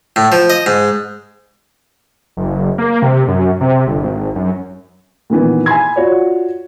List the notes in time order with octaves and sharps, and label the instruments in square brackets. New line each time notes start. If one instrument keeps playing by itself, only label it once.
[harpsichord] A2
F3
D#5
G#2
[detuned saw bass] F#1
A#3
C3
F#2
C3
G1
G#1
F#2
[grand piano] A#2 D#3 E3 B3
G#5 B5 C6 G#6
F4 F#4 C#5 D5